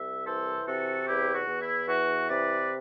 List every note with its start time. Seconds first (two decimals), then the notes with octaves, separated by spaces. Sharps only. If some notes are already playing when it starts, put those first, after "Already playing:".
Already playing: C2 E5
0.26 E3 A4 C5
0.66 C3 F#4 A4
1.06 E2 E4 G4
1.33 F#4
1.47 E2
1.60 E4
1.87 E3 F#4
2.28 C3 B4 D5